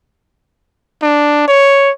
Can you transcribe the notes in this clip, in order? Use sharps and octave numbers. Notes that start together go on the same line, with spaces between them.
D4
C#5